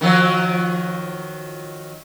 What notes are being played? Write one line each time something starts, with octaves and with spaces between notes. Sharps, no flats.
D#3 F3 F#3